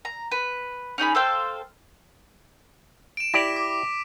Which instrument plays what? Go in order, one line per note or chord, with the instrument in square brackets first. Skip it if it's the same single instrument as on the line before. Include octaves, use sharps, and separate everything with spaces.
[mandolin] A#5
B4
C#4 D#4 G#4 B5
A4 C5 F5 G5
[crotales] D7 E7
[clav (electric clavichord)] E4 G4 D5 [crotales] A#6 B6
[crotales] D6